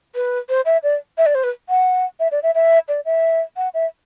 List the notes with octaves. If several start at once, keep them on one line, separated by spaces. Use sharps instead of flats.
B4
C5
E5
D5
E5
D5
C5
B4
F#5
E5
D5
E5
E5
D5
E5
F#5
E5